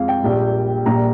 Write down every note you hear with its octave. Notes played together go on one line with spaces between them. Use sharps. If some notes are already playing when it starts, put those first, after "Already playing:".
Already playing: F2 G#3 F5
G5
A#1 A#2 G3
A#1 A#2 G3 A#5